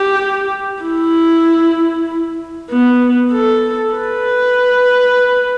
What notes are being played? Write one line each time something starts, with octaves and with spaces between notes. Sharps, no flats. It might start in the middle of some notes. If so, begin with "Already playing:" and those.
Already playing: G4
E4
B3
A4
B4